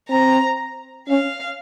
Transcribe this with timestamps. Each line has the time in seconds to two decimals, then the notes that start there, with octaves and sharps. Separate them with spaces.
0.09 C4 A#5
1.08 C#4 F5